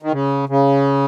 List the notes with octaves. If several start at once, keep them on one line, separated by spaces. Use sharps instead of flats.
D#3
C#3
C#3